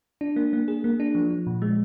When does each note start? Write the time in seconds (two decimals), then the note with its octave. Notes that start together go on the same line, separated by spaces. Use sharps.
0.21 D4
0.36 A#3
0.53 A#3
0.68 G#4
0.84 A#3
1.00 D4
1.15 F3
1.30 F3
1.47 A#2
1.62 G#3